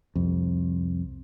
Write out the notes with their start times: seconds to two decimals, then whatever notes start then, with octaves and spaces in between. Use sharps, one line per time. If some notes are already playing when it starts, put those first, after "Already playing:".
0.15 C2 F2